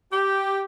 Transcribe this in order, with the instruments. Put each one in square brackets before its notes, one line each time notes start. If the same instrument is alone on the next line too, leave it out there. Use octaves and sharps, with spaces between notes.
[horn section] G4